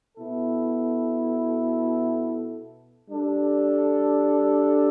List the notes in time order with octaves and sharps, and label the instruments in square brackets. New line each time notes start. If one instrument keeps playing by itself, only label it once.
[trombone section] B2 B3 E4 A4
G3 D4 A4